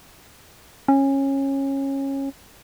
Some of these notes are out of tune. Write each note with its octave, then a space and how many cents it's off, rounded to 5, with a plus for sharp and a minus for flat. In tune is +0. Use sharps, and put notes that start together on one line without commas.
C#4 -20